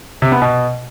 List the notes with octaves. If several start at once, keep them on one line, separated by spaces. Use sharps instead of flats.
C3
B3
B2